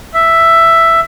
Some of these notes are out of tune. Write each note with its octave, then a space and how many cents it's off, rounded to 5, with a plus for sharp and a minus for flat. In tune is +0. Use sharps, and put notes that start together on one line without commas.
E5 +5